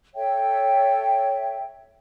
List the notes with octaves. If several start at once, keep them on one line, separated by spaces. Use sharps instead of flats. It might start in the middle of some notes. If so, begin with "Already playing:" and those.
A4 C#5 E5 G5